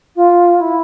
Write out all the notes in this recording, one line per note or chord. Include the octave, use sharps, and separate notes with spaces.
F4
E4